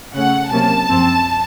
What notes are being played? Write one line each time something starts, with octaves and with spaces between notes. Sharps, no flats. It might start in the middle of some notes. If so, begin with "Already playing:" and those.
C#3 A3 C#4 F#5
C3 F#3 A#3 C#4 A5
F#2 F3 C4